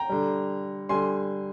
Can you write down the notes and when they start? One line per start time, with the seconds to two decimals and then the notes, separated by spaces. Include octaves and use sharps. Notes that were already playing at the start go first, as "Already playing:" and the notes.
Already playing: G5 A#5
0.09 D3 G3
0.89 D3 G3 G#5 C6